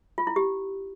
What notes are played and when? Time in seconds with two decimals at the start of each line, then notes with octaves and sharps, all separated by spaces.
0.18 F4
0.27 E4
0.36 G4